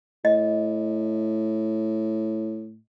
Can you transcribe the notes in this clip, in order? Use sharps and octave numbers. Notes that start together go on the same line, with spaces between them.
A2 D#5